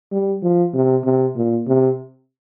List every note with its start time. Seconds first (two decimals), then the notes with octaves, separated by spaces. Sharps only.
0.12 G3
0.43 F3
0.74 C3
1.05 C3
1.37 A#2
1.68 C3